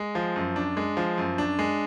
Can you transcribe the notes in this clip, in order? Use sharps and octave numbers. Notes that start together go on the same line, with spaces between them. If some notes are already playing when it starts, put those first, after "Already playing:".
Already playing: G#3
F3
F#2
D4
G#3
F3
F#2
D4
G#3